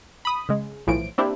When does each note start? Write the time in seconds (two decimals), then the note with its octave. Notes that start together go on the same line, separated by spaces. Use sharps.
0.25 B5 D#6
0.49 C#3 G#3
0.87 B1 A2 E3 F3 D7
1.18 A#3 C4 D4 E4 G4